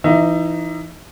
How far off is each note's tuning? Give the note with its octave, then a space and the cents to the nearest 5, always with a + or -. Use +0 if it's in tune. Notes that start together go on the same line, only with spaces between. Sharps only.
E3 +25 D#4 +0 E5 +25